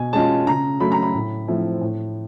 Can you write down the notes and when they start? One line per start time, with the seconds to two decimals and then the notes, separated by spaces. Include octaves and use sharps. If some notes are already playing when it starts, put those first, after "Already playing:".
Already playing: B2 G#5
0.13 G#3 C#4 F4 A5
0.47 C#3 A#5
0.80 F#3 A3 B5
0.92 A#5
1.02 B5
1.14 A2
1.47 F3 A3 C4 E4
1.81 A2